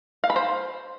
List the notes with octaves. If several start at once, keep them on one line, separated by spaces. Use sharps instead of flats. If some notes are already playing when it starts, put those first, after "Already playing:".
F5
B5
C5